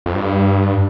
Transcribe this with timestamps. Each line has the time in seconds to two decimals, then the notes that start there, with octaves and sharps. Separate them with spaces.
0.06 F2
0.15 G2